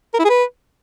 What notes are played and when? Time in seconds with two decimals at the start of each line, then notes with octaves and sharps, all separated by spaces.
0.14 A#4
0.19 E4
0.25 G#4
0.30 B4